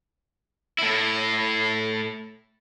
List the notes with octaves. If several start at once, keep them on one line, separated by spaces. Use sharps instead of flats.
A2 E4